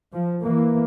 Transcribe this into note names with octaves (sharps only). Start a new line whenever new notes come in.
F3
E3 A#3